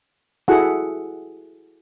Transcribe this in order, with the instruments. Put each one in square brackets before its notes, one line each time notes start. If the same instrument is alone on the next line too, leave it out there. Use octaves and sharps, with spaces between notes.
[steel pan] E4 F#4 G#4 A4 F#5